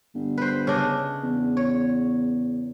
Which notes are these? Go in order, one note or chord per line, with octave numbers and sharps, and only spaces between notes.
G1
B4 C5
C#3 D4 D#5
E2
C#5